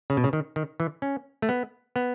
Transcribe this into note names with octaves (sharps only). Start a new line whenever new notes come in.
C#3
B2
C#3
D#3
D#3
E3
C#4
A3
B3
B3